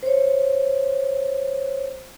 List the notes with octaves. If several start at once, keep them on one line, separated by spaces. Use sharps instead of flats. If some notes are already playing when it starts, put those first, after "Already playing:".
C5 C#5